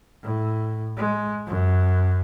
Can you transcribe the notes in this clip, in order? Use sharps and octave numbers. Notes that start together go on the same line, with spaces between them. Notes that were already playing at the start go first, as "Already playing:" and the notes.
A2
G#3
F#2